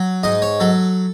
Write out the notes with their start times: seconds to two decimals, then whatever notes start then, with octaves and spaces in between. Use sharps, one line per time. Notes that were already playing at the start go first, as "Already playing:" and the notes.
Already playing: F#3
0.23 G#2 D#5
0.42 C#5
0.60 F#3 A4